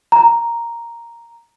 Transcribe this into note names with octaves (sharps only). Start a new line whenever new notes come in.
A#5